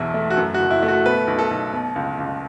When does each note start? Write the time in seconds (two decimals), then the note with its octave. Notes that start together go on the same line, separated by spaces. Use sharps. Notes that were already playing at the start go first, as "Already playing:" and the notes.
Already playing: B1 E2 B2 E4
0.14 A3
0.30 F#4
0.37 F#2 A4
0.54 F#4
0.60 F#1
0.71 E4
0.83 A3
0.88 F#4
1.05 B2 B4
1.27 B1
1.39 A4
1.51 B1
1.73 B2
1.96 C#2
2.18 C#2